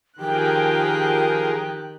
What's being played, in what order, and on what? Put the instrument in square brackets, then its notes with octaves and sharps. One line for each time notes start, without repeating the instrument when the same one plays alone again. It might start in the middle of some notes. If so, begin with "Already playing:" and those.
[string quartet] D#3 G4 F#6 [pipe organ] F3 G#4 A#4 [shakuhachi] G5